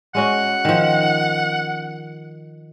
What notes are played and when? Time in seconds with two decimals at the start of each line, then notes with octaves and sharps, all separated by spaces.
0.15 G#3 C#4 F#4 F#5
0.65 D#3 F3